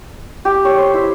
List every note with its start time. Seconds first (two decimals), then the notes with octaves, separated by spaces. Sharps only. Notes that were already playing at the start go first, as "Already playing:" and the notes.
0.45 G4
0.65 C#5
0.78 C5
0.94 E4